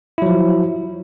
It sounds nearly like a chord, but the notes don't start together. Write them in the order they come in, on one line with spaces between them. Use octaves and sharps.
E4 F#3 F3